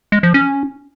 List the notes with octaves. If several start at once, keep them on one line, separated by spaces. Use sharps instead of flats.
G#3
F3
C#4